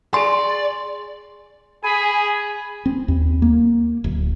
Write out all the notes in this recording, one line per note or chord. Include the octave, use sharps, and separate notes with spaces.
G#4 D5 G#5 C6
G#4 G#5 B5
C4
D#2
A#3
D1